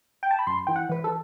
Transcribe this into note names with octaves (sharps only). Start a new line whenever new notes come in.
G5
A5
B5
F#2 C6
E3 G5
F#5
E3 B4
A4